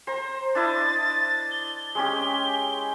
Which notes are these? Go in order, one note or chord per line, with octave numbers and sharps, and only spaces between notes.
C5 A#5
D4 E4 D#5 A6
G7
G#3 C#4 G4